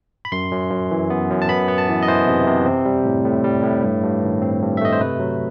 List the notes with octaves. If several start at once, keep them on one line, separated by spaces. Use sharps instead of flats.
B5
F#2 C6
F#2
F#2
E3
B3
F#2
A5
B3 B5
B3
A5
E3
D#5
E3 C5
C3
C3
C4
G3
A2
A2
G3
A2
G2
G2
D#3
C4
G2
E5
A3 D#5
C5
C3 B4
F#3